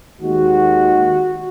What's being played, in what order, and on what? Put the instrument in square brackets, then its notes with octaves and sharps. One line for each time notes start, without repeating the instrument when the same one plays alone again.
[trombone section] D#2 D#3 G#3 F#4